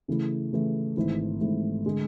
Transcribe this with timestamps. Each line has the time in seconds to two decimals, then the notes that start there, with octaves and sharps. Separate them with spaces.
0.08 C#3 E3 A3 E4
0.53 C#3 E3 A3 E4
0.97 G#1 G#2 E3 A3 E4
1.41 G#1 G#2 E3 A3 E4
1.86 D3 G#3